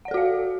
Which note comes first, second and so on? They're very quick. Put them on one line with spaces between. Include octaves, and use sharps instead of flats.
F#5 D5 A4 F#4 F5